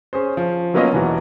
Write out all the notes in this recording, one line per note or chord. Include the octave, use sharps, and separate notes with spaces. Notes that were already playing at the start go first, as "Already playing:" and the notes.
C#4 G#4 C5
F3
F#3 A#3 B3 C#4 F4 D#5
E1 E3 F#4